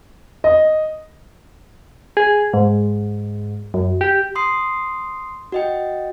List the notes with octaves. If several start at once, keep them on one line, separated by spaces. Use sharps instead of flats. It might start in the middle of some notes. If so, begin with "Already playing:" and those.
D#5
G#4
G#2
F#2
G4
C6 D#6 C7
F#4 D#5 G5